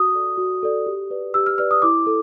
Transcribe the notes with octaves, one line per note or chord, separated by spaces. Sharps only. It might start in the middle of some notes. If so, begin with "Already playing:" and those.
Already playing: F#4 D#6
A4 D5
F#4
A4 D5
G4
B4 D5
G4 E6
F6
B4 D5 F6
D#6
E4 D6
A4